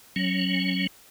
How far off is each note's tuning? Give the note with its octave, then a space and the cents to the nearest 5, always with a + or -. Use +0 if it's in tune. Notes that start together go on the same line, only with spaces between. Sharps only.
F#3 +0 C#4 -15